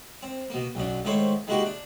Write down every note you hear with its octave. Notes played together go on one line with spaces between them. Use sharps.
C4
B2 A#3
B1 F#2 D4
G#2 D#3 A3 E4 C5 C#5
D#3 G#3 A#3 E4 F#4 G4
D4